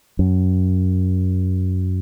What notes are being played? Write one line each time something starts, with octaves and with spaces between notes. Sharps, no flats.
F#2